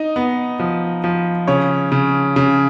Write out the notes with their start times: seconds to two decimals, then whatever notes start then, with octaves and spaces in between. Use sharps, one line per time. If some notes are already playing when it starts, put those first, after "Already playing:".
Already playing: D#4 D#5
0.16 B3
0.60 F3
1.04 F3
1.48 C#3 C#5
1.92 C#3
2.36 C#3